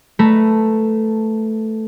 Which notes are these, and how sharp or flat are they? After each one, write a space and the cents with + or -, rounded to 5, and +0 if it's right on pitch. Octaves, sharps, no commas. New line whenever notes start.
A3 +0 B4 +0 A#5 +0